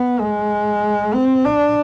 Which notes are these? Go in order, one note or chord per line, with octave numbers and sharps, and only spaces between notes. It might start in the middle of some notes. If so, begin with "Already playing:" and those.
Already playing: B3
G#3
C4
D4